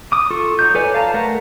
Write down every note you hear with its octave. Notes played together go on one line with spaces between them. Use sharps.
D6 D#6
F4 A4 C#6
F#3 D#4 G6
A4 B4 C#5 D5 G#5
F5 A5 A#5
A3 A#4 F#5 A#5